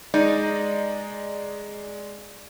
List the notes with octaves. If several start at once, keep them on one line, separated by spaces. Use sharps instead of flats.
G#3 D#4 D5 G6